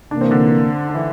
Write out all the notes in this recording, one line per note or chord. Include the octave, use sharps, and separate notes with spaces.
C3 E3 A#3 D4
C4
D3 D4
D4
E3 E4